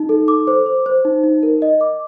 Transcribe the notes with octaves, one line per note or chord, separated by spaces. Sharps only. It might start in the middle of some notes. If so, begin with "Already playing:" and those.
Already playing: D#4
A4
D6
C5
C5
C5
D#4
D#4
A#4
D#5
D6